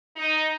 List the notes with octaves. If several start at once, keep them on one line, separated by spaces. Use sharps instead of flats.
D#4